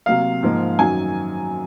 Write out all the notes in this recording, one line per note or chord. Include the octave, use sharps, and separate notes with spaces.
C3 F#3 A#3 F5
G#2 F3 A#3
F#2 D#3 F#3 G#5